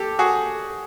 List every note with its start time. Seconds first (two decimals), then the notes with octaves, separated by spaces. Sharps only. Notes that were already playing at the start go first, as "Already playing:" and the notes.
Already playing: G4 A4
0.19 F#4 G#4